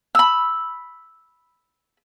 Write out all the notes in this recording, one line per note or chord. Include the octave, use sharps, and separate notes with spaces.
B5 E6